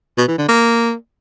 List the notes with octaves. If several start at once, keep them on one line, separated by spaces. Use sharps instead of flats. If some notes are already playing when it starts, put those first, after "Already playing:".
B2
E3
D3
A#3